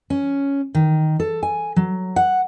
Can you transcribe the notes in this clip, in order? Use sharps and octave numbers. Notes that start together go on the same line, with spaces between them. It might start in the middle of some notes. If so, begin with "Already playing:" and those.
C#4
D#3
A4
G#5
F#3
F#5